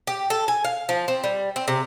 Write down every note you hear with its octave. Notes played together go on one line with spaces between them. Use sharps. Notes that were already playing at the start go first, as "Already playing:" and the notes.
G4
A4
G#5
F5
F3
C4
G3
C4
C3